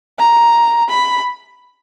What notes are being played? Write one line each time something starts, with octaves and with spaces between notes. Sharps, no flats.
A#5
B5